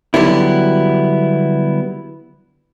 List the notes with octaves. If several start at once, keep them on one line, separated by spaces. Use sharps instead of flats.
D3 F#3 G3 B3 E4